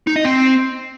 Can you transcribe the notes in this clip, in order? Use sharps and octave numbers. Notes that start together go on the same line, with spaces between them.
D#4
D#5
C4